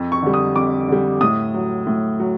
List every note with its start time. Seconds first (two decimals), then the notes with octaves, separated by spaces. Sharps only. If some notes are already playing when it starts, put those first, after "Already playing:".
Already playing: F2
0.12 C#6
0.23 D3 G3
0.34 D#6
0.56 F2 D6
0.88 D3 G3
1.21 A2 D#6
1.54 F#3
1.87 A2
2.20 F#3